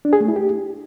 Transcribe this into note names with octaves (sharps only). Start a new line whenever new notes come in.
D4
G#4
A3
E4
G4